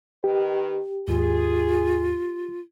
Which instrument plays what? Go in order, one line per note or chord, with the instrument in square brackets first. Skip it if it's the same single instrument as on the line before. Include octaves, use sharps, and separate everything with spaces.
[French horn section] D#3 B4 [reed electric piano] G4
[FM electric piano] D#2 G#2 [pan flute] F4 [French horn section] G#4